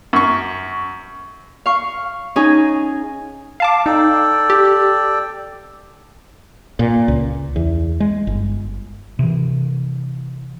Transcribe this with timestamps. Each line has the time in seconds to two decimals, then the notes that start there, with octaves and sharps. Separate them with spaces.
0.13 F#2 C#6
1.66 F5 C#6
2.36 C#4 D#4 G#4 G#5
3.60 F5 A5 D6
3.86 D#4 A4 D5 G5
4.50 G4
6.79 A#2
7.08 C#2
7.56 E2
8.00 G#3
8.27 G1
9.19 C3 E3